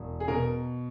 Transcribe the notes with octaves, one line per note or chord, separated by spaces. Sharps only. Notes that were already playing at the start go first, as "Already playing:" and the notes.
Already playing: E1
G#4
B2 A#4